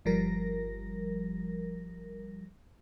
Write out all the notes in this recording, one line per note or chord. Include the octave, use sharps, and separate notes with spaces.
G1 F3 G3 A#4 A#6